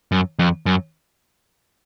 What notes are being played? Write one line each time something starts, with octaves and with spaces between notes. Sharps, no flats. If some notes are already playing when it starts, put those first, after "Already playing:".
F#2
F2
F#2